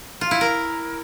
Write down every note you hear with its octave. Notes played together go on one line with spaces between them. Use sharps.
F4
E4
A#4